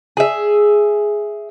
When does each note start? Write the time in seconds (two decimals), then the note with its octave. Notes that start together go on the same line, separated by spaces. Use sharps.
0.17 G#4 E5